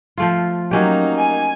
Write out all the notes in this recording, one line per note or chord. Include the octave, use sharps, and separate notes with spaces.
F3 A3 F4
F#3 A#3 C#4 D#4 G4
G#5